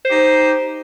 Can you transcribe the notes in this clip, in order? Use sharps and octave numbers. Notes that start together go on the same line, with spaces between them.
D#4 G4 C5